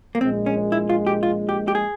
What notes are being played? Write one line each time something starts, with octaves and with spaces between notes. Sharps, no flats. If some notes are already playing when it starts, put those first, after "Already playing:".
A#3
A#1 A#2 G#3 C4
C#4
E4
F4
G4
F4
G4
G4
G#4